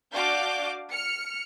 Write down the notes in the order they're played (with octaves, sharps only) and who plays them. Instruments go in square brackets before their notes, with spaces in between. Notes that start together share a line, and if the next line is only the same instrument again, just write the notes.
[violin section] D4 F#4 D5 F5 D6 G6
F6 C#7